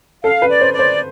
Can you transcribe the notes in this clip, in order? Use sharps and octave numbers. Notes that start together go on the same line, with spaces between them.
A4 F5
B4
D5
C5
D5
C5